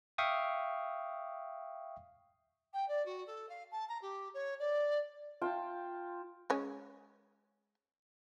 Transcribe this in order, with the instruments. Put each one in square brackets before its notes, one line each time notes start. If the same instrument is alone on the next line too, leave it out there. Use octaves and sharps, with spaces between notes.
[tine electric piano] E5 F5 G5 C#6 D#6
[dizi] G5
D5
F#4
A4
F5
A5
A#5
G4
C#5
D5
[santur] F4 G5 A5
[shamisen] G#3 C#4